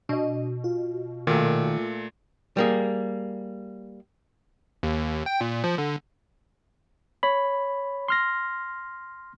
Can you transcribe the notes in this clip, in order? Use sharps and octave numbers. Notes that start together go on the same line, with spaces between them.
B2 D4 D#5
F4
A#2 D#3 A3
G3 A#3 G#4
D#2
G5
A#2
F3
D3
C#5 B5
C6 F6 A#6